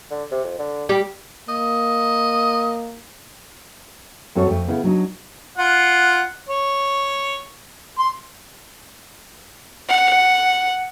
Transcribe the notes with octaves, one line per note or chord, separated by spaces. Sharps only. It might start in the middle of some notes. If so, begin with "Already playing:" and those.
D3
C3
F2
D3
G3 G4
A#3 D#5
F#2 C4 F#4 A4 C#5
F2 A3
C#3 B3 E4
F#3 D4 D#4
F4 F#5
C#5
C6
F#5